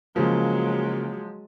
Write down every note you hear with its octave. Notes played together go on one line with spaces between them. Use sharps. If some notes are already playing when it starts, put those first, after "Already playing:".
C#3 F3 F#3 G#3 A#3